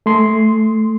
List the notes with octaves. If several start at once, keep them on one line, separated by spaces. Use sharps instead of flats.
A3 C6